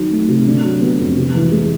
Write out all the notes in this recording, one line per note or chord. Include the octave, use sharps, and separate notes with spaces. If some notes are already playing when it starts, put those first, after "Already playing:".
Already playing: D#3 F#3
A3
C3
D3
F#3
B3
F2
C3
E3
G#3